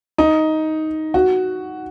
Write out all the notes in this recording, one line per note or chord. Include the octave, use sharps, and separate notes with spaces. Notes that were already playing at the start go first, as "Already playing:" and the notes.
D#4
F#4